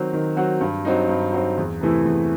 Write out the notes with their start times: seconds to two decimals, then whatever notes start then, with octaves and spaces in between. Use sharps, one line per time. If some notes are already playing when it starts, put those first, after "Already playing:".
Already playing: D#3 F#3 C4 F#4
0.13 D#3
0.36 F#3 C4 F#4
0.61 G2
0.85 F#3 C4 D#4
1.09 G2
1.33 F#3 C4 D#4
1.57 E2
1.81 C3 E3 A3 E4
2.05 E2